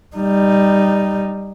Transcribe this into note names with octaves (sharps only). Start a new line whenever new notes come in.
G3 D#4